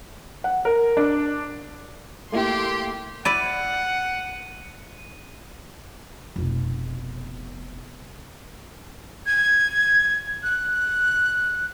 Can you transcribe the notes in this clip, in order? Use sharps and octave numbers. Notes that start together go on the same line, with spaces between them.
F#5
A#4
D4
A3 A#3 E4 G4 C6
E4 D5 F#5 D#7
F1 B2
G#6
F#6